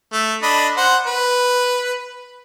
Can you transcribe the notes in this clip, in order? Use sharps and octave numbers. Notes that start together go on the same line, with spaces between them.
A3
D4 D#5 B5
C5 F#5
B4